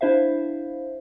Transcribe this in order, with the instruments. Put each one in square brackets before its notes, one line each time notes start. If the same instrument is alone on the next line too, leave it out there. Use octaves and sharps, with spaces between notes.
[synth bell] D4 E4 C5 E5 F5